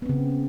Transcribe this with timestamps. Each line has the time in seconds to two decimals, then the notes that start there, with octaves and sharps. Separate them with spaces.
0.02 B3
0.06 C4
0.09 C#3